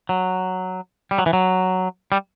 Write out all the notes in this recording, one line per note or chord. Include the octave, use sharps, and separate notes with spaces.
F#3
G3
F#3
E3
F#3
G3